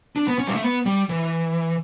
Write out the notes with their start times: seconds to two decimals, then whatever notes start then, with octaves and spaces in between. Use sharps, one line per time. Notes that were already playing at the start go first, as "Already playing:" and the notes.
0.16 D4
0.28 B3
0.39 C#4
0.47 G3
0.55 A3
0.62 B3
0.86 G3
1.09 E3